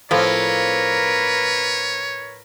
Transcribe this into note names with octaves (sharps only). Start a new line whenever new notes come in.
A2 F3 A#3 C4 A#4 B4 C#5